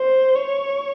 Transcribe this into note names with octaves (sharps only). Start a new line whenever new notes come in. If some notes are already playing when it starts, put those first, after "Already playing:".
Already playing: C5
C#5